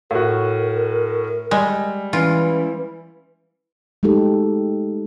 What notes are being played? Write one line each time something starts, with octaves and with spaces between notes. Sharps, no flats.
A2 F#4 A#4
G3 G#3
E3 C#4 F4
G#3 A3 D#4 G4 A4